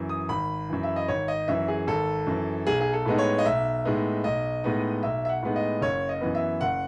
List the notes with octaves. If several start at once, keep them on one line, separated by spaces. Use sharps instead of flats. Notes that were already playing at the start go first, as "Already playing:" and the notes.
Already playing: F#2 E3
D#6
G#1 B5
F#2 E3
E5
D#5
G#1 C#5
D#5
F#2 E3 E5
G#4
G#1 A4
F#2 E3
B1 G#4
G#4
A4
A2 G#3 B3 D#4
C#5
D#5
B1 E5
A2 G#3 B3 D#4
B1 D#5
A2 G#3 B3 D#4
B1 E5
E5
F#5
A2 G#3 B3 D#4
D#5
F#1 C#5
D#5
F#2 E3 B3
E5
F#1 F#5